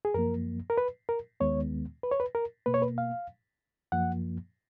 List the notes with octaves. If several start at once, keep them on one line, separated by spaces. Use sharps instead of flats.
G#4
F#2 F3 A#3 A#4
A#4
B4
A#4
D#2 D#3 G#3 B3 C#5
B4
C#5
B4
A#4
B2 A#3 B4
C#5
B4
F5
F#2 F3 A#3 F#5